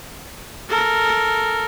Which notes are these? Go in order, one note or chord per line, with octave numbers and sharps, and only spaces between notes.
A4 A#4